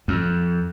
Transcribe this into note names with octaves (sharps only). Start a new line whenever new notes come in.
F2